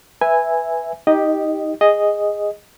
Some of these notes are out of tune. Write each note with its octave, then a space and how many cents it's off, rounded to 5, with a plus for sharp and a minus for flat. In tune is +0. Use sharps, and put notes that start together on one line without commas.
B4 +0 E5 +0 G#5 -10
D#4 +20 G4 +0 D#5 -5
G#4 -15 D#5 +0